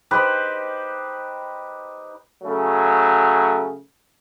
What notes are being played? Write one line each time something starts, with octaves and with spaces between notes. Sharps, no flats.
D#4 G4 B4 C5
C#3 F#3 A3